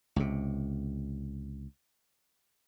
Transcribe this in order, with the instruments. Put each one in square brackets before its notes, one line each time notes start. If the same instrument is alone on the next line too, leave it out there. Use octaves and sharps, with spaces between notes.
[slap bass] C#2 C3